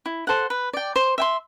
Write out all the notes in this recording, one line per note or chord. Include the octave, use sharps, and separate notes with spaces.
E4
A4 C5 F#5
B4
D5 G5
C5
E5 G5 C6